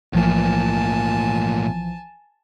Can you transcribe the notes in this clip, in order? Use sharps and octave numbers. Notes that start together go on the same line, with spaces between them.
B1 A2 E3 F3 A#3 G#5 A5